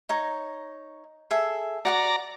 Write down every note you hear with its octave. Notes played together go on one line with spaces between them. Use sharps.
D#4 C#5 A#5
G#4 A4 E5
F#4 D5 F#5 A#5 D6